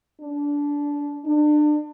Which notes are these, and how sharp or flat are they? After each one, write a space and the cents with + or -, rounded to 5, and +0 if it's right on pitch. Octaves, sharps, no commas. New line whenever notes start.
D4 -20
D4 +30